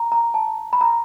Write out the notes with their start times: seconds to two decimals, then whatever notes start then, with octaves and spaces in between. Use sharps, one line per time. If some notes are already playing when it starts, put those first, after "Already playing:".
Already playing: A#5
0.12 A#5
0.34 A5
0.73 B5
0.81 A#5